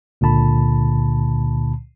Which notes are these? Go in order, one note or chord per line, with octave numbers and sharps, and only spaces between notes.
C#2 A#2 D3 A5 B5